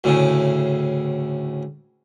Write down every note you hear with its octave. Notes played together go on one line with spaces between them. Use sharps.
D2 A2 C#3